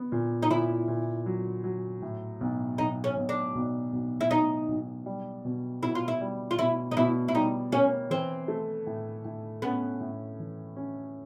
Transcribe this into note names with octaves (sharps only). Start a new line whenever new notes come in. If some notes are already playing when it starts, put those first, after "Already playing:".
Already playing: B3
A#2
D#4
A#2 E4
A#2
F#3
F#3
A2
B1
B1 D#4
C#4
B1
D4
B1
B1
E4
B1 D#4
B1
G3
B2
B2 E4
F4
E4
G3
F4
B2 E4
D#4
B2 E4
E4
G3 D#4
A#3 C#4
E3 C4
A3
A2
A2
B3 C#4
A2
E3
C#4